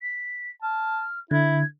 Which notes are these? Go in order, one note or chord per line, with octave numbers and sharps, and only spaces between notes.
B6
A5 F6
D3 E4 G#6